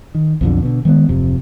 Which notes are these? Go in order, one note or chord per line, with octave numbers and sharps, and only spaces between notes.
D#3
B1 F2 D3
B2 D3
D#3 G#3 A3 B3
D1 F2 C3